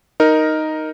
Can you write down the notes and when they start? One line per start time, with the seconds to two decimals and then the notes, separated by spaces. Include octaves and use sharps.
0.20 D#4 A#4